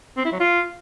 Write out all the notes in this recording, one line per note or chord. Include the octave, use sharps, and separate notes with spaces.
C4
E4
F#3
F4